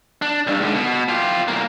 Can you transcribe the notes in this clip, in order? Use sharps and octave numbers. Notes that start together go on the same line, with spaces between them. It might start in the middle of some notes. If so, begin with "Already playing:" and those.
D4
B1 G2
G#2 D3
B2
F4 G4
C2 A#3